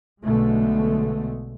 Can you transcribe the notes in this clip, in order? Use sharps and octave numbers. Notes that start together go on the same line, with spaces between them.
B1 B2 D3 G#3 A3